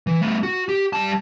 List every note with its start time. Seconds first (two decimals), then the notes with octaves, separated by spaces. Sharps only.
0.07 E3
0.21 A3 B3
0.43 F#4
0.69 G4
0.93 G3 A5